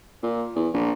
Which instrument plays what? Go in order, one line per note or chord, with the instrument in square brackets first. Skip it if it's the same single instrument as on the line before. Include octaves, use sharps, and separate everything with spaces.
[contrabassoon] A#2
E2
A#1